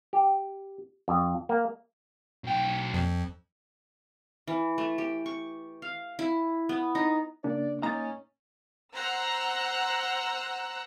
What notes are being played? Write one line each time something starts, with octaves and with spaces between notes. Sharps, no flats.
G4
F2
A#3
B1 G5
F2
E3
A3
G4
C#6
F5
E4
B3
D#4
C#3 A#3 D4 D5
A#3 C#4 D#4 D#5 A#5 A6
C5 F#5 A#5 E6 F#6